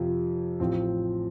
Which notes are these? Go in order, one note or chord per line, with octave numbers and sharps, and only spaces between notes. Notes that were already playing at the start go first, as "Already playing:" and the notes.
Already playing: F2 C3 F3
A1 A2 F3 C4